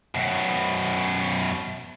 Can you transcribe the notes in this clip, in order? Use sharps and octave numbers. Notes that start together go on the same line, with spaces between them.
F#2 B2